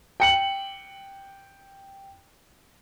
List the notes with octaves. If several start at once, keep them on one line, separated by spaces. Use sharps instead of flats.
G5 C#7 F#7